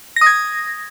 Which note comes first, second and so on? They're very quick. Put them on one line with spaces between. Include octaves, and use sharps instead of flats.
A#6 D#6 G#6